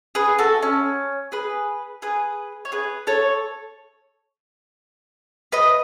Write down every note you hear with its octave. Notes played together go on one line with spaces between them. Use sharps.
G#4 B4
F#4 A4
C#4
G#4 B4
G#4 B4
C#5
G#4 B4
A4 C#5
B4 D#5